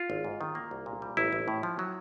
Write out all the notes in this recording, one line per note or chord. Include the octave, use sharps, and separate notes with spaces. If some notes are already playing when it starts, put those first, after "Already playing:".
Already playing: F4
G#1
G#2
D#3
A#3
C2
A#2
G3
A1 E4
A1
A2
F3
F#3